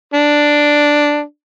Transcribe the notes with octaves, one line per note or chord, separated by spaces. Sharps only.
D4